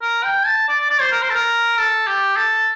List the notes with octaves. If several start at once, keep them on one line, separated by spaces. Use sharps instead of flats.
A#4
G5
A5
D5
D5
C5
A#4
C5
A4
A#4
A4
G4
A4